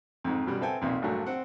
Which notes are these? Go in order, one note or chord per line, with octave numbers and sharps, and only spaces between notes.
F2 G#2
F#2 B2 G3
B3 C4 A4 E5 G5 G#5
B1 F2 A#2
A#1 G2 F#3 A3
C4 F#5